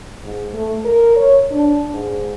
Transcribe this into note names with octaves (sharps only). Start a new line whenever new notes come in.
G#2
A3
A#4
C#5
D4
G#2